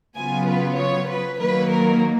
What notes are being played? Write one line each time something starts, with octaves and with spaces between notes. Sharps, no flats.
C#3 F#3 B3 F4 G#5
B4
C#5
B4
D#3 F#3 A#3 B4
A#4